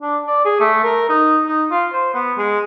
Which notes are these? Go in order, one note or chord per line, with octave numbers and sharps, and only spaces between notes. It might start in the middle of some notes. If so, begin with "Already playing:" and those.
D4
D5
G#4
A3
A#4
D#4
D#4
F4
C5
B3
G#3